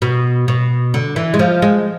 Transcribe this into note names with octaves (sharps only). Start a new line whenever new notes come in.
B2
B2
D3
E3
G#3
F3
G#3